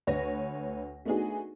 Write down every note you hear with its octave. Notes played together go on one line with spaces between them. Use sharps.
D2 B4 C#5 A#6
A3 B3 D4 D#4 F#4 G#4